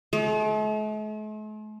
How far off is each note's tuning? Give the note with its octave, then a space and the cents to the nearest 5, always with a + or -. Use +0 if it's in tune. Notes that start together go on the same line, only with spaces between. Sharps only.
A3 -45